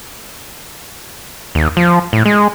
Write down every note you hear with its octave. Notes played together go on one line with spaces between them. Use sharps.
D#2
F3
A2
G#3